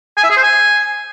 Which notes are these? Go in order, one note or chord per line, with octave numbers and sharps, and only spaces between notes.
G#5
E5
G#4
C5
G#5